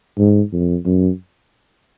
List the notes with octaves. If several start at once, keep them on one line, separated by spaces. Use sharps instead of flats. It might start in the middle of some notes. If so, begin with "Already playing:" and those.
G#2
F2
F#2